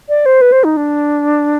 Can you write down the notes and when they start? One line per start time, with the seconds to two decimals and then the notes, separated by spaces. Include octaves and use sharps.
0.09 D5
0.26 C5
0.41 B4
0.52 C5
0.64 D#4
0.77 D4